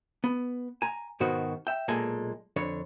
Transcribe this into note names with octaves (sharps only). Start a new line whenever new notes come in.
B3
G#5 A#5
G#2 B2 D#3 F#4 C5
E5 G5
B1 A#2 G#3 A4 G#5
F2 D3 C#5